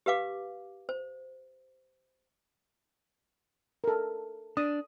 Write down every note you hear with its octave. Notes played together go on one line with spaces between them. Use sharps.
G4 B4 F5 D6
C5
A4 A#4
D4 D#6